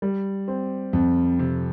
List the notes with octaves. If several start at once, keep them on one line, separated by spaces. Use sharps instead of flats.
G3
C4
F2
C3